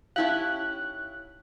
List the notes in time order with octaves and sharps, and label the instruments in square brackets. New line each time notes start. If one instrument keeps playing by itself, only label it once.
[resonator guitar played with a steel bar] C#4 E4 G4 [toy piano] D#4 F5 [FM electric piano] F#6